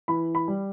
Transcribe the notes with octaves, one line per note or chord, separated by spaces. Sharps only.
E3 B5
B5
G3